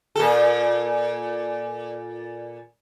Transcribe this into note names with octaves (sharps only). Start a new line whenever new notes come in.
A#2 A4